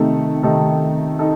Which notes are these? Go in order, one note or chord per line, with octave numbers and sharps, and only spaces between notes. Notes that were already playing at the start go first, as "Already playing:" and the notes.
Already playing: C3 D#3 A3 D#4 A4
C3 D#3 A3 D#4 A4
D#4 A4